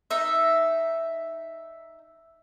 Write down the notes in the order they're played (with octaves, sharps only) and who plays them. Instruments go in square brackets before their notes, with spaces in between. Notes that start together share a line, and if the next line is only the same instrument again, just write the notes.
[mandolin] D#4 E5